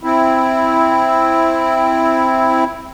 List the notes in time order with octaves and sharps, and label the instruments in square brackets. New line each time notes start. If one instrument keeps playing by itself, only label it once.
[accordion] C4 E4